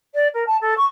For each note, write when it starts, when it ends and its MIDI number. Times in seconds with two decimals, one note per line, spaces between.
0.14 0.27 74
0.33 0.43 70
0.46 0.57 81
0.61 0.74 69
0.77 0.85 85